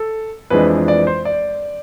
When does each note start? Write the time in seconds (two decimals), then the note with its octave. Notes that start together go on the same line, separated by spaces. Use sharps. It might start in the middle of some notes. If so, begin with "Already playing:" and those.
Already playing: A4
0.50 F2 E3 G#3 D4 B4
0.88 D5
1.07 C5
1.25 D5